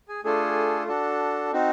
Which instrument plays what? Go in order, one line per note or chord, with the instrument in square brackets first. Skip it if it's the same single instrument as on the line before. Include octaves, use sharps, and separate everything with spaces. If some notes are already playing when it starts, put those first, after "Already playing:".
[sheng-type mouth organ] G#4 G#5
A3 D4 F4 G#4 A4 G#5
D4 F#4 A4
C4 D#4 F#4